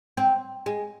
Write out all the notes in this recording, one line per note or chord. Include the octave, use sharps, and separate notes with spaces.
C4
G#3